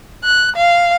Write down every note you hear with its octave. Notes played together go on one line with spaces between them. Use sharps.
F#6
F5